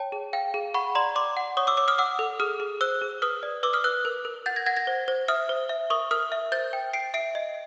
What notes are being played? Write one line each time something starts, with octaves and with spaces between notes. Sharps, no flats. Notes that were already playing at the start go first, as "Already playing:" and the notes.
Already playing: C#5 G5 A5
G#4
F5 G5
G#4
F#5 B5 C#6
D5 A#5 C6
D5 C6 D6
F#5
C#5 C#6 D#6
D6 E6
C#5 D6 E6
D#6 F6
F#5 D6 E6
A4
G#4 D#6 F6
G#4
C5 E6 F#6
G#4
B4 D#6 F6
D5
B4 D6 E6
D#6 F6
B4 E6 F#6
A#4
A#4
F#5 G6 A6
G#6 A#6
F#5 G#6 A#6
G#6 A#6
C5
C5
E5 D#6 F6
C5
E5
A#4 C#6 D#6
A#4 D#6 F6
E5
C5 G6 A6
G5
G5 C7 D7
E5 C7 D7
D#5